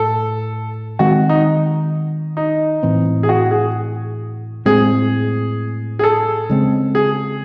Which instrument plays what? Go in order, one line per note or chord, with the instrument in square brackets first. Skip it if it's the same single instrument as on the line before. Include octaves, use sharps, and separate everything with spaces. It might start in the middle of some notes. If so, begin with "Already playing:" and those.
Already playing: [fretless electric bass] A2 [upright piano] A4
[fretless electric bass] D#3 G#3 C4 [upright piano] F#4
[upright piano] D#4
D#4
[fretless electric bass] A2 E3 C4
[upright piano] G#4
F#4
G#4
[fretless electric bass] A2 G#3 C4 [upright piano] G#4
[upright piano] G#4
A4
[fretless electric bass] C#3 G#3 C4
[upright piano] G#4